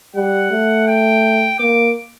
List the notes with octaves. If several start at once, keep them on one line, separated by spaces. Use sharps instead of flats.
G3 F#5
A3
G5
A#3 D6